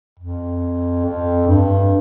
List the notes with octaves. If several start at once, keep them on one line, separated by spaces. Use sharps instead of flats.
F2
F2
G2